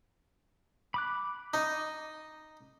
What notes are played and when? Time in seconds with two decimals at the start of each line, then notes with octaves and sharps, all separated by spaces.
0.94 B5 D6 F#6
1.54 D#4